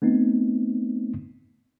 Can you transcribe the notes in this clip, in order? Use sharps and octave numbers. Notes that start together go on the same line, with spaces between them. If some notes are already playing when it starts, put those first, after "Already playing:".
A3 B3 C4 D#4